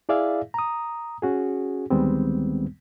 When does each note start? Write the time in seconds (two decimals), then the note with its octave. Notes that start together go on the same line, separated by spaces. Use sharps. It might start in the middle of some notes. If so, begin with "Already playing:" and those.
0.09 E4 G#4 D5 E5 F5
0.54 A#5 D#6
1.22 C#4 F#4 G#4
1.90 D2 D#3 G3 G#3 B3 C4